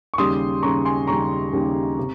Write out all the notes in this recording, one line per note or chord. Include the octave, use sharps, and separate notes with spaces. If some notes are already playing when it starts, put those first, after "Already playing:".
C#6
D#2 C#3 G3 C6 D#6
D#2 C#3 G3 A#5 C#6
G#5 C6
D#2 C#3 G3 A#5 C#6
D#2 C#3 G3
C3